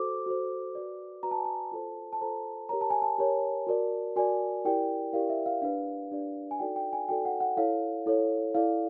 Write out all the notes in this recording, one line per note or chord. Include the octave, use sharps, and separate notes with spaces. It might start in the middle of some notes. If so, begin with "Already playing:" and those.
Already playing: F#4 A4 C5 D6
F#4 A4 C5
F#4 B4 D5
F#4 B4 D5 A#5
A5
G#5
A5
F4 A4 C5
A5
F4 A4 C5 A#5
G4 A#4 C#5 A#5
A5
G#5
A5
G4 A#4 C#5
F#4 A#4 D5
F#4 A#4 D5 G#5
E4 G4 A#4 D5 G5
E4 G4 A#4 D5 F5
E5
F5
D4 G4 B4 D5 F5
D4 G4 B4 D5
G#5
D#4 F#4 A4 D5 G5
G5
G#5
D#4 F#4 A4 D5 G5
F#5
F#5
E4 A4 C#5 F5
E4 A4 C#5
E4 A4 D5 F5